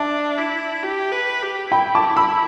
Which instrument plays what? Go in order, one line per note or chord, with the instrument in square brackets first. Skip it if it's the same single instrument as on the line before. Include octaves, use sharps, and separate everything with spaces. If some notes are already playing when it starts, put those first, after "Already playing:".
Already playing: [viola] D4 [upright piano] E5 A5
[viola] E4
G4
B4
G4
[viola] E4 [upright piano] G5 B5
[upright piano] A5 D6
B5 E6